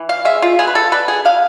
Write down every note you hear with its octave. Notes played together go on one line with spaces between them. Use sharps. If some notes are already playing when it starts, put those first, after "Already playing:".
Already playing: E3
F5
G#3 E5
F4
B3 G#4
B4
A4
D3 B4
G#4
D3 F5